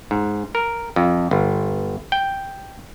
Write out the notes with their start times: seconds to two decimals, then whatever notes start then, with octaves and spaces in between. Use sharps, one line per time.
0.11 G#2
0.55 A#4
0.96 F2
1.31 G1
2.12 G5